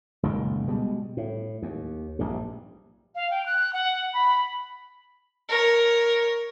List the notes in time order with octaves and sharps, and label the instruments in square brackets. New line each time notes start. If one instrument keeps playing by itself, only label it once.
[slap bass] F#1 C#2 A#2 D#3
B2 G3 G#3
A2
D#2
A#1 G2
[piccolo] F5
G5
F#6
F#5
B5
[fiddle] A#4 C#5